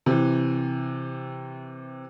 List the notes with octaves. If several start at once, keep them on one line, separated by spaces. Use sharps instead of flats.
C3 E3